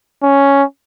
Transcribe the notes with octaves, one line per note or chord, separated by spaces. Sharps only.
C#4